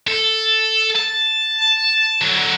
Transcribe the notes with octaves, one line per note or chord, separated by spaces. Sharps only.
A4
A5
D3 F#3